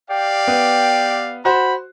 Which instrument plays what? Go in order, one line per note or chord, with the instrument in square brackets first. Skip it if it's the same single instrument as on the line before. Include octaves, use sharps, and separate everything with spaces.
[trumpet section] G4 D5 F5 [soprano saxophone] G5
[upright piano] B3
[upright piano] F#4 C5 [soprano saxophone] B5